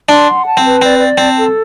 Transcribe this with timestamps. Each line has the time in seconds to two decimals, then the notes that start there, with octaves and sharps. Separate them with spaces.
0.08 D4 C6
0.27 F#5
0.45 A5
0.57 C4
0.63 B4
0.82 C4 D5
0.99 D5
1.17 C4 A5
1.36 A4